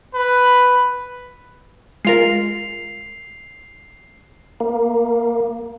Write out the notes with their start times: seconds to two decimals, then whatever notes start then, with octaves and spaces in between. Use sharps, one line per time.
0.15 B4
2.05 G#3 F4 A#4 C7 F7
4.60 A#3